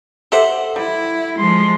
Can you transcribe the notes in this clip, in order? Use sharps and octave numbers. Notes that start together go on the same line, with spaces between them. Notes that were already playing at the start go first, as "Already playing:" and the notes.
G4 A4 C5 E5 F#5
G3 E4
F3 G#3 C6